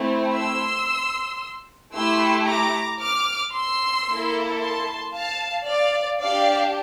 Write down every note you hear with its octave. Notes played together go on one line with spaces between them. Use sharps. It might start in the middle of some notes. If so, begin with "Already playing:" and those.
Already playing: A3 C4 E4
C6 E6
A3 E4 G4 C6 E6
A#5 D6
D6 F6
C6 E6
A#3 E4 A4
A5 C6
F5 A5
D5 F5
D4 G4 D5 F5